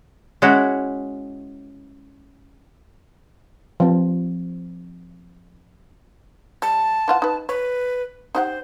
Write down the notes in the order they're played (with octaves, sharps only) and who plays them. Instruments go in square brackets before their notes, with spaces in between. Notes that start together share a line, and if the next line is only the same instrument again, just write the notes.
[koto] G#3 C#4 E4 F#4
[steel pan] F3 C4
[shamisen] G3 [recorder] A5
[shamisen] E3 F4 F#5
D#4 B4
[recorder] B4 [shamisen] C#5
[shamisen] D#4 G4 F#5 [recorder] C5